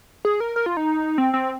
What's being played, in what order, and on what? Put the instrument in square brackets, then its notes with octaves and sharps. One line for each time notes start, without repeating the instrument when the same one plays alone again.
[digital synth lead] G#4
A#4
A#4
F4
D#4
C4
C4